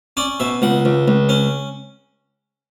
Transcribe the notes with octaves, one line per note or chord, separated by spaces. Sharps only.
C#4 D5
B2 E5
C#2 F#5
C#2
C#2
C#4